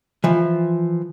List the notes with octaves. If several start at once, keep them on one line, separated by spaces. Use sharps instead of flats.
E3 F3